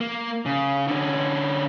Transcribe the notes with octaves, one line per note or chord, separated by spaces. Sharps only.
A#3
C#3
D3 C#4